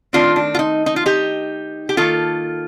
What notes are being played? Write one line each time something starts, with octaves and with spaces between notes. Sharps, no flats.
D#3 A3 C4 D4 F4
D4
F4
D#4
D#4
F4
D#4 G4
G4
D#3 A#3 F4 A4